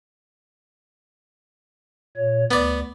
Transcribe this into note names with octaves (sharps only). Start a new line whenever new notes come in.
A#2 C#5
D2 B3 D5